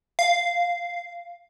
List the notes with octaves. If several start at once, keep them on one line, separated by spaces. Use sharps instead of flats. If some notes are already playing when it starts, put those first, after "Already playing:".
F5